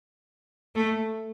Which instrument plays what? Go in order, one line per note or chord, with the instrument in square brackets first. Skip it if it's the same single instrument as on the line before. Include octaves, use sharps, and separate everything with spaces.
[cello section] A3